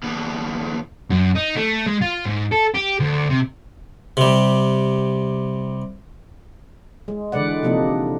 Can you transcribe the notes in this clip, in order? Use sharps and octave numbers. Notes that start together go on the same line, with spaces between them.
D#2 B3
F#2
D#4
A3
G#3
F4
G#2
A4
G4
D2
C3
C3 G3
G#3
D3 E3 G#3 B4 D5 F#5
C3 F3 A#3 D4 D#4